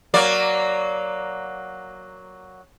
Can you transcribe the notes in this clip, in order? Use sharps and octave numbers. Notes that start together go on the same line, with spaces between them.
F#3 A#3 D5